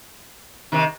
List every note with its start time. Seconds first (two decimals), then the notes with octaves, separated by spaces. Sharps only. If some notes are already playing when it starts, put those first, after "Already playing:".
0.72 C3 D#3